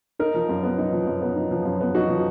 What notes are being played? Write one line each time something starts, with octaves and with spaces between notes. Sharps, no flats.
D#4 A#4
F3
F#2
B3
D#4
F3
F#2
B3
D#4
F3
F#2
B3
D#4 F#4
F3